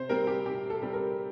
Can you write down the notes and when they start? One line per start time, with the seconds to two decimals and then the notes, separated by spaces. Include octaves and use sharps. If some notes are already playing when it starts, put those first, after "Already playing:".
Already playing: C3 C5
0.09 G3 C4 A#4
0.27 G4
0.45 C3 G4
0.70 A4
0.82 G3 C4
0.93 A#4